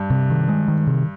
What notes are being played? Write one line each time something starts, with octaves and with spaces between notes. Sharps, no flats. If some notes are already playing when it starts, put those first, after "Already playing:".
Already playing: G2
C3
D#3
G#3
D#3
C3